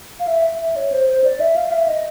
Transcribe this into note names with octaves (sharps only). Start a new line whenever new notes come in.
F5
E5
E5
C#5
C5
C5
D5
E5
F5
E5
D#5